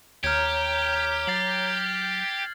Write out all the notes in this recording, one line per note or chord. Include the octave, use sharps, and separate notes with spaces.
D#2 G4 C#5 A#5 F6 G6 G#6
F#3 A6 C7 F#7